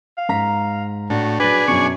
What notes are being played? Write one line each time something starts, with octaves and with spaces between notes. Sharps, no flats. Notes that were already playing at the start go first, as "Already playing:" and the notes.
F5
G#2 A#5 B6
A2 D4 F#4
F#3 D4 G#4 B4 A6 F#7
F#2 B2 C#6